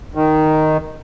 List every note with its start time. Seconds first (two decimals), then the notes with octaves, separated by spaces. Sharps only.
0.15 D#3